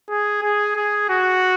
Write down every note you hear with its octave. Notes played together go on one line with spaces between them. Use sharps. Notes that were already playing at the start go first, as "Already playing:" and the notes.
G#4
G#4
G#4
F#4